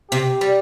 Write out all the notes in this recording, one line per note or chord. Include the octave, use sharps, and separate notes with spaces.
C3 C4 G4
G3